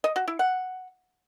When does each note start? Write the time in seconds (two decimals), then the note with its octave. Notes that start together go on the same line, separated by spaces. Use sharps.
0.04 D#5
0.16 F#4
0.28 E4
0.39 F#5